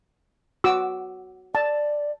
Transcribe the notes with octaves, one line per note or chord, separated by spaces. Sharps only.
F#4 D6 E6
D5 A5